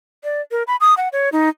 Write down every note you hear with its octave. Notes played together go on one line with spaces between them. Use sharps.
D5
A#4
B5
D#6
F#5
C#5
D#4